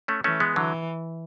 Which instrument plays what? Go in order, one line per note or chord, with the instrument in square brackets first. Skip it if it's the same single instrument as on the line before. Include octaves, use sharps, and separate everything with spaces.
[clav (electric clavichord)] A3 C#4
[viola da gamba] E3 [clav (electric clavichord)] A3 C#4
[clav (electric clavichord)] G#3 B3
[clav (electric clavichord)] D3 F#3 [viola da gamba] E3